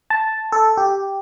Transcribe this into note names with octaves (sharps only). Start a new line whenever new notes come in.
A5
A4
G4